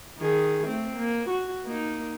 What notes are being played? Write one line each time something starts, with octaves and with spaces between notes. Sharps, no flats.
D#3 G#4
A3 C4
A#3
F#4
A#3 D#4